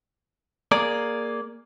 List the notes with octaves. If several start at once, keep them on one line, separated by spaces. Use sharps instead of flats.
A#3 G#4 D5